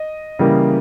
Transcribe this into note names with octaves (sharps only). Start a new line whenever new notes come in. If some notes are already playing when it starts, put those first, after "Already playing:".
Already playing: D#5
C#3 E3 G3 A#3